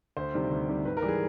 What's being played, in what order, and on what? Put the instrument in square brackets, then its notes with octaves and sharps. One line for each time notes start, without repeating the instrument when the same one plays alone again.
[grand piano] D2 C5
C3 D#3 G3
D2
C3 D#3 G3
G#2 B4
A#4
E3 G3
G#4